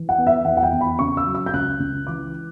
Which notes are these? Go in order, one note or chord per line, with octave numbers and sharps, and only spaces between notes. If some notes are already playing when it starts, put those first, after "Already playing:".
Already playing: E3
F#5
B3
E5
E2 F#5
F#5
G5
E2
B5
C#3 C#6
E6
F#3
E6
G6
C#2 F#6
C#2
E3 D6